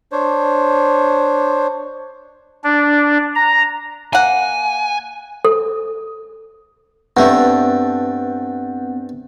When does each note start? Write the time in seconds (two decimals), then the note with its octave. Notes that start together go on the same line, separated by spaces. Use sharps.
0.12 D4 C5 C#5
2.64 D4
3.36 A#5
4.13 A#3 F#5 G#5
5.45 A4
7.17 G2 A3 B3 C4 F#5